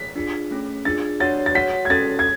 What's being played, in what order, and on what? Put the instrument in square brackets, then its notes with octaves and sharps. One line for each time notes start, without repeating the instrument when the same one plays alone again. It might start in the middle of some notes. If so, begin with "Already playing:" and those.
Already playing: [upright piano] B6
[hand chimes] D4 F4 G#4
A3 C#4 G#4
[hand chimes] D4 F4 G#4 [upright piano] A6
[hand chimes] D4 F#4 C#5 F#5 [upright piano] A6
[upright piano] A6
[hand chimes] F#4 C#5 F#5 [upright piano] B6
[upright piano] G#6
[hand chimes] C#4 F#4 A4 [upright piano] A6
[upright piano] G#6